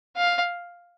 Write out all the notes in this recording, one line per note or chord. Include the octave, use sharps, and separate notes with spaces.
F5